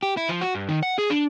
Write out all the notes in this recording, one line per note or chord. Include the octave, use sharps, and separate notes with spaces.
G4
E4
F3
F#4
G2
D#3
F#5
G#4
D4